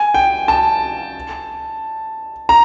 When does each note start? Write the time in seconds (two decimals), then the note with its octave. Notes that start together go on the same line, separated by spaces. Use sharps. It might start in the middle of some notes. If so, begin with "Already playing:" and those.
Already playing: G#5
0.14 G5
0.48 A5
2.49 A#5